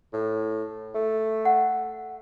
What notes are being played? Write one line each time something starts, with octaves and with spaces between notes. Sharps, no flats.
A2
A3
F#5